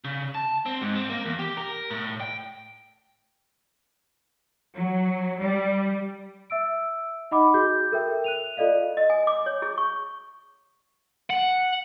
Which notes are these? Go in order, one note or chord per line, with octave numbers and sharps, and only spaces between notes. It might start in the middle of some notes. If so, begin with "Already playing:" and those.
C#3
A5
C4
G#2
C4
A#3
E2
G4
A#4
A2
G5
F#3
G3
E5 E6 D7
D#4 D#5 F#5 B5 D6
F#4 G#4 G6
A4 A#4 E5 G5
F#6 D#7 F7
F4 A4 D5 D#5 F5
D#5
G#5
D6
C#5
G#4
C#6
F#5